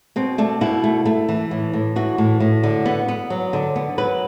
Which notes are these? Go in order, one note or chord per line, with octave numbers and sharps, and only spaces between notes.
B2 C4
A3 D4
B2 E4
A3
A3
E3
A2
A2
E3 F#4
A2
A2
D3
B3
B3
F#3
D3
B3
F#3 B4